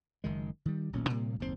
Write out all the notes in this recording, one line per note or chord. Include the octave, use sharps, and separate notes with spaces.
F#1 D#3 G#3
D#3 G3
D#1 B1 A#2 C#4
A2 C3 G3 A#3
F#1 D#2 C3 C4